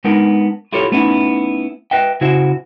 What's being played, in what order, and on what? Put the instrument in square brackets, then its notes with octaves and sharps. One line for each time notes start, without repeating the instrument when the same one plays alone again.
[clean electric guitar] G#3 B3 D4 D#4 A#4
E4 F4 G4 A4 C#5
A3 B3 C#4 D#4 E4
B4 D#5 E5 G5
C#3 E4 F#4 C5 E5